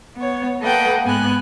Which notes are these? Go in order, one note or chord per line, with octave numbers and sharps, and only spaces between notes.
B3 C#5
A#3 A4 B4 D#5 F#5 G5
G#2 B3 G#5 F#6